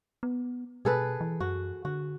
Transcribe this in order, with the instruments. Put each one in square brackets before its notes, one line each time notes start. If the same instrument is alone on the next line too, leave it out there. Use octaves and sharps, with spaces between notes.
[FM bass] B3
[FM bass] B2 [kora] G#4 A4 B4
[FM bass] E3
[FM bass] F#2 [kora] F#4
[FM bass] D3 [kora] F#4